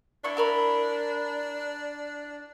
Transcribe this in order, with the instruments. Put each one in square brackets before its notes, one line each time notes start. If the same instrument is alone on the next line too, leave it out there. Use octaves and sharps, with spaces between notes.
[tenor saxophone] D4 [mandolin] E4 C#6
[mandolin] E4 A#4 B5